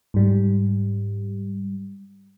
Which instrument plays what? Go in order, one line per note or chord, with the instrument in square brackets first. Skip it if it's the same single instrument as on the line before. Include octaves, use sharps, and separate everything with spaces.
[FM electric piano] G#2 G3